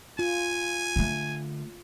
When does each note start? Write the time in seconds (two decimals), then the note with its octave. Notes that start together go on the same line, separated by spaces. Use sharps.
0.19 F4 G#5
0.96 D3 A3